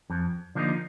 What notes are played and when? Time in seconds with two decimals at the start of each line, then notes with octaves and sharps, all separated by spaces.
0.10 F2
0.55 D3 F3 A#3 D#4